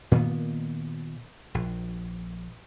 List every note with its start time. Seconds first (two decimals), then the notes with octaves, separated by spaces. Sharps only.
0.11 A#2 D#3 A#3 B3
1.54 A#1